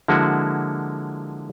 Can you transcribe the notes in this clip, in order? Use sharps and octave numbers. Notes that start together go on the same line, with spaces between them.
D3 F3 G#3 A#3 E4 F#4